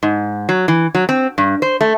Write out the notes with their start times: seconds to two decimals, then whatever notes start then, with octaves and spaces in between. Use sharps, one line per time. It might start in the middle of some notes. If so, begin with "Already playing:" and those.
0.03 G#2
0.49 F#3
0.68 E3
0.95 F#3
1.09 C4
1.38 G2
1.62 C5
1.81 A3